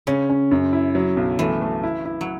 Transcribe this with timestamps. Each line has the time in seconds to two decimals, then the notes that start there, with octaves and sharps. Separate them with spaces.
0.07 C#3 C#4
0.30 C#4
0.51 F#2
0.73 E4
0.95 F#3
1.17 B1
1.39 E3 A3
1.61 A3
1.83 E4
2.05 E4
2.21 F#3